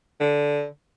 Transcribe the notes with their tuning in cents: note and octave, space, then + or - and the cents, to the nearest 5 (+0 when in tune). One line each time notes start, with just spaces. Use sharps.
D3 -10